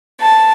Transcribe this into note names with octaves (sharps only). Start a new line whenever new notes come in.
A5